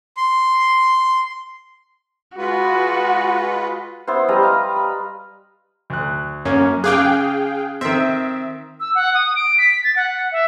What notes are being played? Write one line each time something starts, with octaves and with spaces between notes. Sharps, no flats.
C6
G#3 F4 F#4 B4
B3 E4 C5
G3 B4 D#5 A#5
F5
B5
D2 F#6
F#2 A#3 C#4
C#3 G#4 F5 G5 D6 F#6
D#3 C4 E5
E6
F#5
D#6
D7
B6
A6
F#5
E5